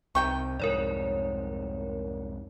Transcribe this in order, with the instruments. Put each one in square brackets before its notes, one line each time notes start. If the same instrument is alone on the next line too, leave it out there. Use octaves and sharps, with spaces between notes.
[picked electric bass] C2 C3 [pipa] D#3 G5 C#6
[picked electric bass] C2 F2 G#2 [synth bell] A#4 C#5 D5